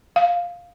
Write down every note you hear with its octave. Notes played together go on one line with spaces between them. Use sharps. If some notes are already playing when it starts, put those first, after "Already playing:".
F5